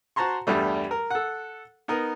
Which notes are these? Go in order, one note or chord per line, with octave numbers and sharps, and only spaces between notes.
F#4 C5 A5 A#5 C6 C#6
E2 G2 G3 A3
A#4
A4 F#5
B3 D#4 A#4